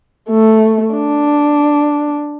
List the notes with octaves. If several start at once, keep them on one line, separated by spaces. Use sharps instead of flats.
A3
D4